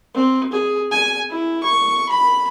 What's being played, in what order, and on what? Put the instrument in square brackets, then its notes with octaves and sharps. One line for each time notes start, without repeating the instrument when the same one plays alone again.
[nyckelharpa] C4
G#4
G#5
E4
C#6
B5